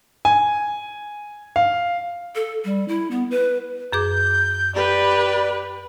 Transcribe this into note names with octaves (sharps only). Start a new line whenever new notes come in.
G#5
F5
A4
G3
E4
B3
B4
F#2 G#4 D6 G6
G4 B4 D5